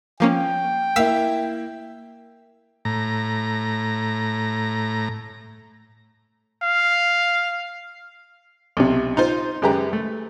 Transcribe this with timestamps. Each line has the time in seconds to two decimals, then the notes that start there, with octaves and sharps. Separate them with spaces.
0.20 F3 A#3 C#4 G5
0.96 A#3 E4 F5 E6 B6
2.85 A2 A#5
6.63 F5
8.77 B1 C3
9.17 D#4 F4 C5
9.62 F#2 G#3 G4 B4 A#5
9.93 A3